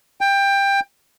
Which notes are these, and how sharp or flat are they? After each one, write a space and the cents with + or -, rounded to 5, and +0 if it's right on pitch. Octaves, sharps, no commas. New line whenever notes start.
G5 +20